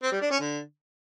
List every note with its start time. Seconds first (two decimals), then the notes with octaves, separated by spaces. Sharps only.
0.03 C4
0.12 G3
0.21 D4
0.30 C#4
0.40 D3